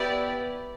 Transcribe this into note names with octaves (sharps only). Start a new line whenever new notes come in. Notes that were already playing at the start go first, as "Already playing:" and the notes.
Already playing: B3 E4 G4 B4 D5